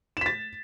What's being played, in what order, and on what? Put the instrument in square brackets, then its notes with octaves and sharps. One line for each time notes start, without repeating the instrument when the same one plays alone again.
[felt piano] E7
B6
A6